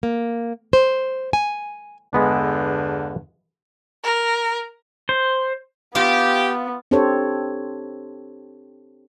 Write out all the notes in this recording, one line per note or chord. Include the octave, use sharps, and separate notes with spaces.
A#3
C5
G#5
E2 G2 D3 G#3 B3 D4
A#4
C5
B3 F4 G4
C4 D4 G4 A4 C5 C#5